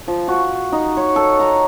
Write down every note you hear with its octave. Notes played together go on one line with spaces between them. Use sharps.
F3
F#4
D#4
C#5
A4
A#5